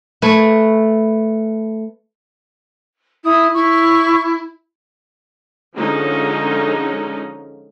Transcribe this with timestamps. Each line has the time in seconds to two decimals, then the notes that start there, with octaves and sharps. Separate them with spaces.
0.22 A3 B4 G#5
3.24 E4 D#6
3.54 E4 C#6
5.75 D3 F3 G#3 C#4 D#4